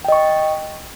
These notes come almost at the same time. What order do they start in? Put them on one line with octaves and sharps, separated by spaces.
G5 D#5 C#6